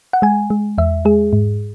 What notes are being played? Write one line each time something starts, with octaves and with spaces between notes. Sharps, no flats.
F#5
G#3 G#5
G#3
E2 E5
G#3 G#4
G#2